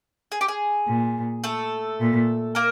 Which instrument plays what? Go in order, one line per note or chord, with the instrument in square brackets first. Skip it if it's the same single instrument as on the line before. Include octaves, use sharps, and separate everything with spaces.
[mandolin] G#4
G4
G#4
[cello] A#2
[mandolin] A3 A4
[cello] A#2
[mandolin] A#3 A#4